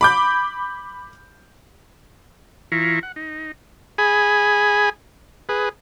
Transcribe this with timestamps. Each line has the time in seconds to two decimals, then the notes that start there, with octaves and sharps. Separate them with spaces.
0.01 B5 D6 G6
2.72 E3 E4 F4 A#5 C#6
3.03 F#5
3.16 D#4
3.98 G#4 G#5 B5
5.49 G#4 B4